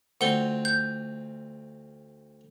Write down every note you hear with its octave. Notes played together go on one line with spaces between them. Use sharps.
D2 C4 F4 F#5 G7
G6